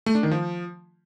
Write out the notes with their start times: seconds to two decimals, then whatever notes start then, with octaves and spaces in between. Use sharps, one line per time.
0.06 A3
0.15 D4
0.23 D#3
0.31 F3